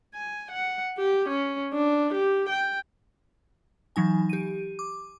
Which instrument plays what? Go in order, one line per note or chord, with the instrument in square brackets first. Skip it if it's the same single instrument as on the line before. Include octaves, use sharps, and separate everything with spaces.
[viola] G#5
F#5
G4
C#4
D4
G4
G5
[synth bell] E3 F#3 D#4 G#5
G4 D#7
D6